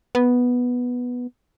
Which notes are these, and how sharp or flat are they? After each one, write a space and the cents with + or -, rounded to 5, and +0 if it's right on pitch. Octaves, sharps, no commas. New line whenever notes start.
B3 -5